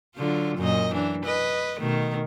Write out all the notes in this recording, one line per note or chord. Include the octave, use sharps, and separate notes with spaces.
D3 F#3 F4
F#2 A#2 D#5
E3 D4
B4 D#5
B2 D#3 A3